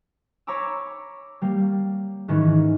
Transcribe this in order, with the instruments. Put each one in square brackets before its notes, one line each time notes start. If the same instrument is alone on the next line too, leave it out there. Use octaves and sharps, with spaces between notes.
[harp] C#5 A#5 B5 D6 E6
G3 A#3
G#2 D#3 E3 C#4